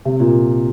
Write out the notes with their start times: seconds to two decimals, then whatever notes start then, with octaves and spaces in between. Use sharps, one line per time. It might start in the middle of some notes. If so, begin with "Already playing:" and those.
0.05 C3
0.20 A#2